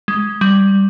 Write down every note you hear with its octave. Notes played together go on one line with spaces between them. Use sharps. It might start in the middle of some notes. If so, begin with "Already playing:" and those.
G#3
G3